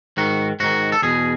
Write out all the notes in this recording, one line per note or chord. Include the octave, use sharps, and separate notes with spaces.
G#2 D#3 F#4
G#2 D#3 F#4
A4
E2 B2 G#4